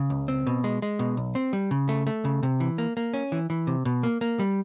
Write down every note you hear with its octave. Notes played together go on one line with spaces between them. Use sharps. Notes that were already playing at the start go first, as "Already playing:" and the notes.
Already playing: C#3
C#2
C4
B2
G#3
G#3
B2
B1
C4
G3
C#3
A3
A3
C#3
C3
E3
A#3
A#3
C#4
E3
E3
C3
B2
A#3
A#3
G3